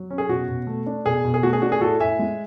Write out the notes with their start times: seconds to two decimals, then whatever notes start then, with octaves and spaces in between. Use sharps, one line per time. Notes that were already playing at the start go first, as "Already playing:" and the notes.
Already playing: F#3
0.10 C#4
0.18 G#4
0.29 B2 F#4
0.48 B2
0.67 A3
0.86 D4
1.06 B2 G#4
1.24 B2
1.34 G#4
1.43 A3 F#4
1.53 G#4
1.62 D4 F#4
1.72 G#4
1.81 A2 F#4 A4
2.00 A2 E5 G#5
2.19 G#3